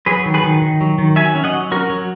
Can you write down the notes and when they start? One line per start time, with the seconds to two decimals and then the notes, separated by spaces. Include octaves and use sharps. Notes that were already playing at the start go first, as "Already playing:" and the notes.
0.06 F#3 G#4 B4
0.26 D#3
0.34 G#4 B4
0.44 D#3
0.62 D#3
0.81 F#3
0.98 D#3
1.16 F#3 E5 G#5
1.35 C#4
1.44 D#5 F#5
1.53 F#3
1.71 C#4 F#4 A#4
1.90 F#3